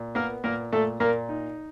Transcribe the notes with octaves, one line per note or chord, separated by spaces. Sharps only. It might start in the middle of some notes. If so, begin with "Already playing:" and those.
Already playing: A#2
A#3 B3 A#4
A#2 A#3 A#4
A#2 A3 A4
A#2 A#3 A#4
D#4